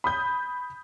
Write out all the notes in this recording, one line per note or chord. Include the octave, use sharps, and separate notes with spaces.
B5 D#6 G6